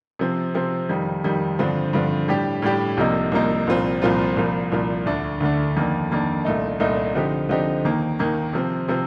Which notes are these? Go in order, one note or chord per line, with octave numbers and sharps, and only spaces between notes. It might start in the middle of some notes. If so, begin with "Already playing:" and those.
C3 F3 C4
C3 F3 C4
F2 D#3 G3
F2 D#3 G3
G2 D3 F3 C4
G2 D3 F3 C4
A2 G3 D4 G4
A2 G3 D4 G4
C2 C3 F3 A#3 D#4
C2 C3 F3 A#3 D#4
C2 A#2 F3 C4 F4
C2 A#2 F3 C4 F4
C2 A#2 F3
C2 A#2 F3
D2 D3 A3 D4
D2 D3 A3 D4
F2 D#3 A#3 D4
F2 D#3 A#3 D4
C2 A#2 A3 D#4
C2 A#2 A3 D#4
D3 F3 C4 D#4 G4
D3 F3 C4 D#4 G4
D#2 D#3 A#3
D#2 D#3 A#3
C3 F3 C4
C3 F3 C4